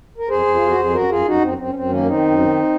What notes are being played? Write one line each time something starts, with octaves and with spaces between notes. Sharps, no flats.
A#4
F2 G#4 C5
F2
F4
F2
F#4
F2 G#4
F#2 F#4 A#4
F#2 F4 G#4
F#2 D#4 F#4
F#2 C4
F#2 C4
C#4
F#2 C4
D#3 A#3 C#4
D#3 C4 D#4
F#2
D#3